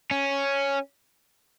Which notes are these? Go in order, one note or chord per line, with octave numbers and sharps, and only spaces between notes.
C#4